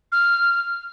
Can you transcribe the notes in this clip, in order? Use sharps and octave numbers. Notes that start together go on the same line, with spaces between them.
F6